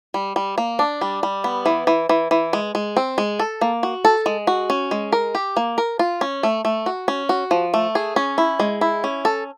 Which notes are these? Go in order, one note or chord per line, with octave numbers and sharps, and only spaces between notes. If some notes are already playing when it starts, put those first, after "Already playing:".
G3
G3
A#3
D4
G3
G3
B3
E3
E3
E3
E3
G#3
G#3
C4
G#3
A4
A#3
F#4
A4
G#3
F#4
C#4
G#3
A#4
G4
A#3
A#4
F4
C#4
A3
A3
F#4
C#4
F#4
F3
A3
G#4
C#4
E4
G#3
E4
C#4
A4